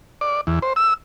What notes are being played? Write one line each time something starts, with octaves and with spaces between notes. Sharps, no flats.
D5
E2
C5
E6